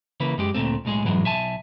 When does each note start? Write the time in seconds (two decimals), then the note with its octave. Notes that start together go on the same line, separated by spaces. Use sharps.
0.20 C#3 E3 A#3 B4
0.38 F#2 G#3 G4
0.54 D2 G2 A#2 A3 C4
0.85 B1 A2 G#3 G#4
1.04 F2 G#2 E3 F#3 G#3
1.24 B1 E5 G#5 A5